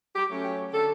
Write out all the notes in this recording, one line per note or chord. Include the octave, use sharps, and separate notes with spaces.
G4
F#3 A3 C#4
G4
D3 A4